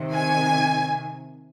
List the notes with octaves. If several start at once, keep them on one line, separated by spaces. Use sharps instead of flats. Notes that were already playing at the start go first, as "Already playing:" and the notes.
Already playing: C3 D#3
G#5